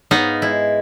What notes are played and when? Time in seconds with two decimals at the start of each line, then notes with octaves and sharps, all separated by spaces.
0.11 G#2 B3 D#4 F5
0.42 G#3 E4